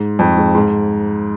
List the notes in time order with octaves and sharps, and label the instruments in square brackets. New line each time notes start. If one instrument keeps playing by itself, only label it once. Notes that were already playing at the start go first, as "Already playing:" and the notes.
Already playing: [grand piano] G#2
F2
G#2
G#2